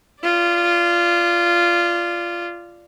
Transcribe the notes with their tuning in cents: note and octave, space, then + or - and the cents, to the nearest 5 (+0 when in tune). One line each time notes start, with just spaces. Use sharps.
F4 -15 D5 +0